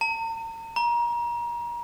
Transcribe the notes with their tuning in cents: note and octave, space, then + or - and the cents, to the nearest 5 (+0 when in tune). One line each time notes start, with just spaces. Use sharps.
A#5 -45
A#5 +30